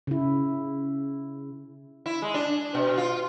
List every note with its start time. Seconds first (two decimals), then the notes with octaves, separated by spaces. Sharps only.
0.07 C#3 E4
2.06 E4
2.22 G#3
2.34 D4
2.75 B2
2.98 F4